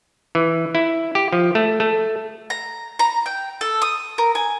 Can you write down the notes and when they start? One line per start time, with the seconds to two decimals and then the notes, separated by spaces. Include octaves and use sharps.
0.35 E3
0.75 E4
1.15 G4
1.33 F3
1.55 A3
1.80 A3
2.50 A#5
2.99 A#5
3.26 G5
3.61 A4
3.82 D#6
4.18 A#4
4.35 G#5